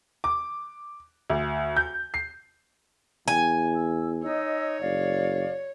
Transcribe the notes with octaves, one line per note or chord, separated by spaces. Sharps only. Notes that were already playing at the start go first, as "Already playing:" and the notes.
D6
D2
G6
C7
E2 G#5
E6
D#4 C#5 D#5 E6
F#1 D5 F5